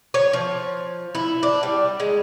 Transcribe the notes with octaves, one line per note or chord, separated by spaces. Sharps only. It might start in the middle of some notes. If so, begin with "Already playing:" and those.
C#5
F3
E4
D4
G3
G#3